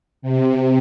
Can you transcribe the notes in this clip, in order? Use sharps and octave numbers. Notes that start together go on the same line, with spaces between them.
C3